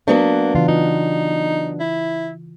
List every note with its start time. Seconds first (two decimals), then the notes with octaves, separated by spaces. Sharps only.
0.08 F#3 A#3 B3 D4
0.55 C#3 E3 F4
0.68 D#4 F4
1.80 E4